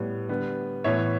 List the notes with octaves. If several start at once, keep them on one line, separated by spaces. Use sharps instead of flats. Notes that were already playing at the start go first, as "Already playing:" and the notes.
Already playing: A2 G3 B3
D3 G3 B3
A2 E3 B3 C#5 E5